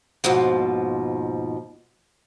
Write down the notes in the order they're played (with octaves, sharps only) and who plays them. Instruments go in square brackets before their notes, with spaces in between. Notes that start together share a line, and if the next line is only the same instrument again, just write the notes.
[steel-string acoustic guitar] D#2 G#2 B2 F3